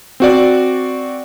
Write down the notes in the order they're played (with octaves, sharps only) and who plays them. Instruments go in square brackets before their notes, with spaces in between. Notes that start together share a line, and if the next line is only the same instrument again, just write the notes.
[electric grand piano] C4 F#4 D5